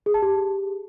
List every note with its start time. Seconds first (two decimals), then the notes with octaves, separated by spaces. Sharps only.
0.06 G#4
0.14 A5
0.22 G4